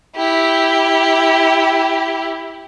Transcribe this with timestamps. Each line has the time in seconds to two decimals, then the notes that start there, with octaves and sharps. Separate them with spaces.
0.16 E4 G4